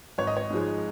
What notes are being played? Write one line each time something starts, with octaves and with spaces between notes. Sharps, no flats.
G#1 C#5
D#5
C#5
G#2 F3 G#3